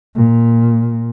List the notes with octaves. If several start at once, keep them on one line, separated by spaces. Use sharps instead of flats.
A#2